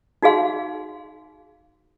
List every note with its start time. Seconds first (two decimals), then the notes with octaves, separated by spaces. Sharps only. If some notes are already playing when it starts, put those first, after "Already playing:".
0.22 D#4 F#4 G#4 F5 C6